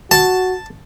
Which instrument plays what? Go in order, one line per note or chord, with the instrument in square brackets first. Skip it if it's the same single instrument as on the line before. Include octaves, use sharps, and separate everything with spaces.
[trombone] F#4 [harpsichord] A5